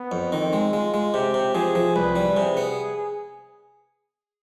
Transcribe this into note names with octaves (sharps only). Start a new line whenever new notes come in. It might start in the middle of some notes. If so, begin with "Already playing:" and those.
Already playing: B3
F2
D#3 C4
G#3
G#3 F4
G#3
C3 G4
C3
F3 G#4
F3
C2 B4
G3
C3 G#4
B3